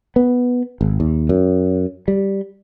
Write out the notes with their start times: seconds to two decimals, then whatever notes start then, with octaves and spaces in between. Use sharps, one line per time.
0.16 B3
0.81 G#1
1.00 D#2
1.29 F#2
2.08 G3